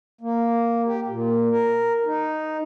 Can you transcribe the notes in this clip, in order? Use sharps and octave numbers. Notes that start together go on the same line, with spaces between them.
A#3
G4
A#2
A#4
D#4